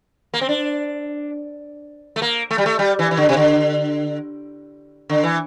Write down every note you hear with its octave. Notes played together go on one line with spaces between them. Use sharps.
A#3
C4
D4
A3
A#3
A3
G3
A3
G3
E3
E3
D3
C3
D3
D3
E3